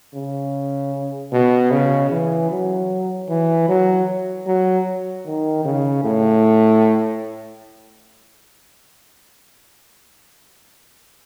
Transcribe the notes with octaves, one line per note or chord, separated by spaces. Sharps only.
C#3
B2
C#3
E3
F#3
E3
F#3
F#3
D#3
C#3
A2